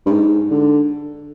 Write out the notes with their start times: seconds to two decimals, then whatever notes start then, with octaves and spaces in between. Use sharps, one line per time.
0.06 G2
0.11 G#2
0.51 D3